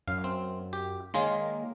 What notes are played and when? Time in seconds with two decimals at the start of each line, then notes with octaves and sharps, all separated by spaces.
0.08 F#2 F5
0.24 C4
0.73 G4
1.14 D#3 G#3 A#3 C#5 F5 C6